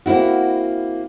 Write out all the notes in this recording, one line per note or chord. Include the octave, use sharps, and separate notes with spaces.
A#3 C4 E4 F#4